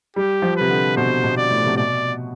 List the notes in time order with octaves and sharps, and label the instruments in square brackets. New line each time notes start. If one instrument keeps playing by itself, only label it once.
[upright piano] G3 [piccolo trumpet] G4
[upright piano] F3
[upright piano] C3 [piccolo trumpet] B4
[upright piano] D3
[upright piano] B2 [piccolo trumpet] C5
[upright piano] B2
[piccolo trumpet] D5
[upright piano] A2
C3
[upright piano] B2 [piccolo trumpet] D5